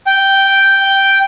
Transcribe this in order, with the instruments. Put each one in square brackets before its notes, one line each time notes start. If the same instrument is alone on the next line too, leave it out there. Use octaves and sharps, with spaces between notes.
[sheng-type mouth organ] G5